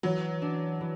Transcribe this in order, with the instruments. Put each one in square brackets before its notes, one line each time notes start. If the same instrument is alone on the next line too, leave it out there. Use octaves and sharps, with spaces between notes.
[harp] E3 [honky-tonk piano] F#3
[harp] D4
E3